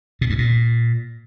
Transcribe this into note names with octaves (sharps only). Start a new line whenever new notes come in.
B2
G2
A#2